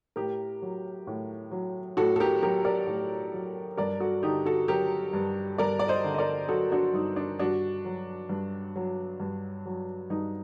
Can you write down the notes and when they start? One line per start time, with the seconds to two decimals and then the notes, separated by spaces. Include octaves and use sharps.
0.16 A2 G4 A#4
0.62 F#3
1.07 A2
1.51 F#3
1.97 A2 F#4 A4
2.16 A4
2.20 G4 A#4
2.42 F#3 G4 A#4
2.65 A#4 D5
2.87 A2
3.33 F#3
3.77 G2 A#4 D5
4.00 F#4 A4
4.23 D3 D#4 G4
4.46 F#4 A4
4.68 F#3 G4 A#4
5.13 G2
5.58 G2 A#4 D5
5.79 D5
5.88 C5 D#5
6.05 D3
6.14 D#5
6.18 A#4 D5
6.49 F#3 F#4 A4
6.72 D4 F#4
6.94 G2 D#4
7.16 D4
7.39 G2 D4 F#4
7.85 F#3
8.29 G2
8.76 F#3
9.20 G2
9.66 F#3
10.10 G2 D#4